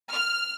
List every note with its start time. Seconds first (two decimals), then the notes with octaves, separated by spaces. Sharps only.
0.11 F6